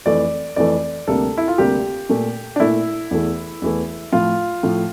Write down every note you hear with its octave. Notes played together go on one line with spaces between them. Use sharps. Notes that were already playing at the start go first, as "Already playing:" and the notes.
F2 E3 A3 D5
F2 E3 A3 D5
D2 C3 G3 A#3 A4
E4
F4
D2 C3 G3 A#3 G4
A#2 A3
D4
A#2 A3 E4
E2 E3 A3
E2 E3 A3
A2 F3 A3 F4
A2 F3 A3